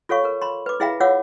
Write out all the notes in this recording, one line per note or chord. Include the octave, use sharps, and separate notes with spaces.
F4 A4 C#5 F5 C#6
A4 A#4
B5 C6
B4 D6
E4 G#4 E5 F5 G5 B5
F4 C#5 F5 F#5 D6 E6